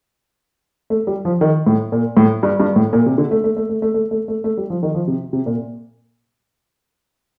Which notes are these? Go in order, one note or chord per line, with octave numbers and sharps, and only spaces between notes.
A3
G3
F3
D#3
A2
A#2
A2
G2
G2
A2
A#2
C3
D3
A3
A3
A3
A3
A3
A3
A3
A3
A3
G3
F3
D#3
F3
C3
C3
A#2